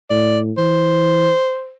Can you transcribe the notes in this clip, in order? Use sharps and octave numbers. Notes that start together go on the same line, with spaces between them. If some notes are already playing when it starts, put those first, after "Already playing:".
A2 D5
E3 C5